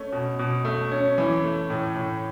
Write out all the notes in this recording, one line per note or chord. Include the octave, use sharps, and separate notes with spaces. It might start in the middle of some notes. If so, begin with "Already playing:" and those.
Already playing: A3 C#4
B2
B2
A3
C#4
E3
A3
A2
A2